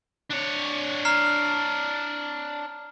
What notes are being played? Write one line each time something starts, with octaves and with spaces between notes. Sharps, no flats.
D4 C#5
A#5 F6 C7